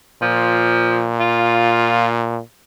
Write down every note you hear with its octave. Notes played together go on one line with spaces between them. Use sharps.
A#2 F3
F4